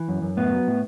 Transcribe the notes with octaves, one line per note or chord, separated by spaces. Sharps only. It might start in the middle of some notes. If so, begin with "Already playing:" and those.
Already playing: E3
F#2
F#2
A2 B3
F#3
A2